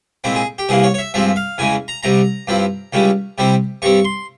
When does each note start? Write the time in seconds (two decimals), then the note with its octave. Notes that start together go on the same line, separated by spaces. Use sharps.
0.24 A#2 G#3 C4 E4
0.35 G#4
0.58 G4
0.69 C2 C3 E3 A#3 G#4
0.83 C#5
0.94 C#5
0.98 E5
1.14 G2 F3 G#3 C4 E5
1.36 F5
1.58 E2 C#3 E3 G#3 G#5
1.88 A#5
2.03 C2 C3 G3 A#5
2.48 G2 F3 C4 E4
2.93 C#2 C#3 G3 C#4 E4
3.38 C3 G3 C4 E4
3.82 G2 G3 C4 C#6
4.05 C6